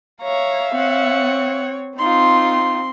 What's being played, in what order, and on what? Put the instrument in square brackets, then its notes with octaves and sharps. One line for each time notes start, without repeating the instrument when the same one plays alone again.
[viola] C#5 A#5 [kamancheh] E5 F5
[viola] C4 C#5 [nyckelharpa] F#5
[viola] C4 [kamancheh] D#4 F4 [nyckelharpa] C6